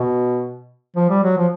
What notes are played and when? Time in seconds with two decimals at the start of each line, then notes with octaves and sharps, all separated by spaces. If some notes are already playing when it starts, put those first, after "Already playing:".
Already playing: B2
0.96 F3
1.09 G3
1.23 F#3
1.37 F3